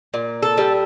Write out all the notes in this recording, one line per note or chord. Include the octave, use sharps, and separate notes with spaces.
A#2
A4
G3